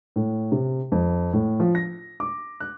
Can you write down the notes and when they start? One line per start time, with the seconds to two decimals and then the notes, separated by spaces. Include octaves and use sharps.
0.16 A2
0.52 C3
0.92 F2
1.33 A2
1.60 F3
1.75 A#6
2.20 D6
2.60 F#6